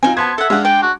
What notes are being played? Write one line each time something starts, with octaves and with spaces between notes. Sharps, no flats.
C4 D#4 F4 G#5
B3 C5 A5 C6 G#6
A4 E5 F#5
G#3 D4 F5 F#5
D5 G5 A5
F#4